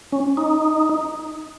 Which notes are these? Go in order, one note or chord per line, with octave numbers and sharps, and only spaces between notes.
C#4
D#4